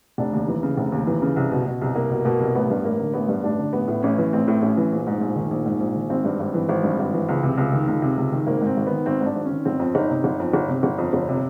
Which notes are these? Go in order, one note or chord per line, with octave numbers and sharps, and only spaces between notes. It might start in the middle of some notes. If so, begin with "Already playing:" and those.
F1 D4
D#2
E3
C#3
F1
D#2
E3
C#3
C2
B2
B2
C2
C2 A#3
B2
B2 A#3
C2
A1 B3
G2
A1 A#3
D3
A1 B3
G2
A1 D4
D3
A1 B3
A2
A1 C#4
E3
A1 C4
A2
A1 C#4
E3
A#1
G#2
A#1
D#3
A#1
G#2
A#1
D#3
G#1 C4
G2
G#1
E3
G#1
G2
G#1
E3
C#2
C3
C#2
D#3
C#2
C3
C#2
D#3
G#1 A#3
G#2
C4
G#1
D#3 B3
G#1 C4
G#2 D4
G#1
C#4
D#3
G1 C4
F2
G1 D#4
C3
G1
F2
G1
C3
G1
F2
G1
C3